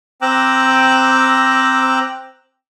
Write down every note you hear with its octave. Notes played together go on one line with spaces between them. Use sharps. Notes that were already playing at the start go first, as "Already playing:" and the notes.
C4 G5 A#5 D6 E6 F#6